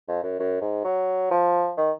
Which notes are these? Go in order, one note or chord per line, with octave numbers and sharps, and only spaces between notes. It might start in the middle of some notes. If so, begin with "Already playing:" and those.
F2
F#2
F#2
G#2
F#3
F3
D#3